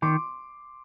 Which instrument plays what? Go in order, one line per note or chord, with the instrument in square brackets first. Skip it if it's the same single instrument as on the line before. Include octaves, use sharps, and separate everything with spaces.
[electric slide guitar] D#3 [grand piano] C6 D6